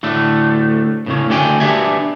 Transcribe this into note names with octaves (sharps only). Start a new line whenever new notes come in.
A2 D3 A3
A2 C#3 C#4
D2 A3 D4 G5 G#5
B3 D4 G4 E5 G#5